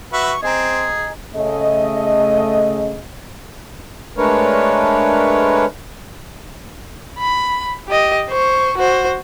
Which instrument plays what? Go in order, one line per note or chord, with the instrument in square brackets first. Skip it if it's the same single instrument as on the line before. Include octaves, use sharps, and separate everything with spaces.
[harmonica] F#4 B4 E5 [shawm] C#6
[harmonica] C4 [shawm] G#4 [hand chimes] D#5 G#5 A#5
[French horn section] C#3 A3 D#5
[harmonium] G#3 A3 D4 A#4 B4 C#5
[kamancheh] B5
G4 D#5
C5 C#6
F#4 C5